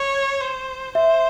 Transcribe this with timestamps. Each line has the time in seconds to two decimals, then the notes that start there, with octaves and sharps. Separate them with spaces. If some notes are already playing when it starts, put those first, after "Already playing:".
Already playing: C#5
0.41 C5
0.95 C5 E5